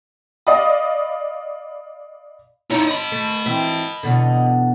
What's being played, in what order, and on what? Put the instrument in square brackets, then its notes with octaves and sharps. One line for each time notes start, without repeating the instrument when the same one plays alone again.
[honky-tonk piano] D5 D#5 F5 B5 D#6
[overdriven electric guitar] D#4 E4 [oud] C#5
[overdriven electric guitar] D#5 B5
[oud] A3
E3 C4 E5
E2 B2 D3